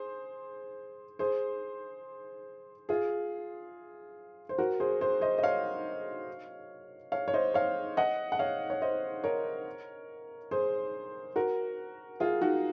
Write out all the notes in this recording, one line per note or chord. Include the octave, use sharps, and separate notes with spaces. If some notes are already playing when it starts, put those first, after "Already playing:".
Already playing: G#4 C5
G#4 C5
F4 G#4
C5
F#4 A#4
G#4 C5
G#4 C5
C5 D#5
D#5
C#5 F5
C#5 F5
C#5
C5 D#5
C#5 F5
D#5 F#5
F#5
C#5 F5
C#5
C5 D#5
A#4 C#5
G#4 C5
F#4 A#4
F4 G#4
D#4 F#4